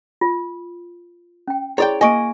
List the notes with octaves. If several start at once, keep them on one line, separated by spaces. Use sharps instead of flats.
F4
C#4 G5
E4 G#4 C#5 D5 G5 C6
A#3 D#5 G#5 C#6 D7